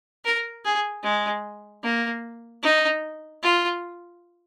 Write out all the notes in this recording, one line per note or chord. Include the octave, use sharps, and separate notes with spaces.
A#4
G#4
G#3
A#3
D#4
F4